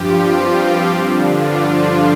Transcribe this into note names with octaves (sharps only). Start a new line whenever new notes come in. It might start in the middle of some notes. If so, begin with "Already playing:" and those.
Already playing: G2 F3 F4 G4
C4
G2 D3 F3 D4
F4